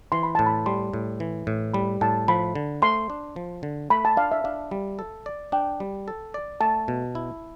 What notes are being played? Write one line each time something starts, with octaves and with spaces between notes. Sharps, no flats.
E3 C6
B5
A2 A5
B5
G3 C6
A2
E3
A2
G3 B5
A2 A5
F3 B5
D3
A3 C6
D4
F3
D3
A3 B5
A5
D4 F5
E5
D4 F5
G3
A4
D5
D4 G5
G3
A4
D5
A3 A5
B2
E4